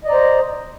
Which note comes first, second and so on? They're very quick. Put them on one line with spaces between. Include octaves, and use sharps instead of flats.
D#5 D5 A#5 C5